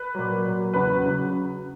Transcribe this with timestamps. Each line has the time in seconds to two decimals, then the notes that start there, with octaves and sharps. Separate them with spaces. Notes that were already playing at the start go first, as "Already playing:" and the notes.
Already playing: B4
0.15 A#2 F#3
0.45 A#2 F#3
0.74 E2 C#3 F#3 B4
1.06 C#3 F#3